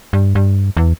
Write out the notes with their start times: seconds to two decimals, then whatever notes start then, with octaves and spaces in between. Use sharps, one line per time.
0.13 G2
0.35 G2
0.77 E2